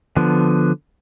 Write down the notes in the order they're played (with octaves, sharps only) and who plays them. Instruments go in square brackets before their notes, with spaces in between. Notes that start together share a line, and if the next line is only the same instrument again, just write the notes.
[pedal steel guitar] D3 F3 B3